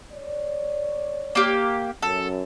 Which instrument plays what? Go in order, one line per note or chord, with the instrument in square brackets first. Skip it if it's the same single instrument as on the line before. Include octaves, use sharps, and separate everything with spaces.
[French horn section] C#5 D5
[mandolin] A#3 G4
[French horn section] F#2 [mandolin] A4